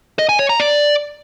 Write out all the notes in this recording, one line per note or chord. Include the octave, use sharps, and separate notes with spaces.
D#5
G#5
C#5
A#5
D5